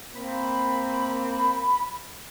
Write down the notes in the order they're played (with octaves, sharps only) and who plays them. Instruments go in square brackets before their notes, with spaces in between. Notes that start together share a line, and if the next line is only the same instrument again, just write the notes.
[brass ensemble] A#3 C4 [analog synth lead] B5